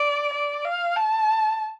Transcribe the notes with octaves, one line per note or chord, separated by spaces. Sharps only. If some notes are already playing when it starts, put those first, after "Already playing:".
Already playing: D5
D5
F5
A5